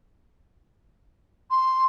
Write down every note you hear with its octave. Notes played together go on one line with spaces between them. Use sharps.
C6